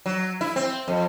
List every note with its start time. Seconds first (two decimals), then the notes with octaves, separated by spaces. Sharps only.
0.06 F#3
0.41 E4
0.56 C4
0.88 F2